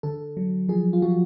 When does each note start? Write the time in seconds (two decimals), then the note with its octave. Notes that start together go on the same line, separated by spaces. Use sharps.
0.03 D3 A4
0.37 F#3
0.69 F3 G#4
0.93 F4
1.02 F3 F#4